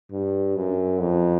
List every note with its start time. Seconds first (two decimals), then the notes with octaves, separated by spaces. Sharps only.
0.11 G2
0.56 F#2
0.99 F2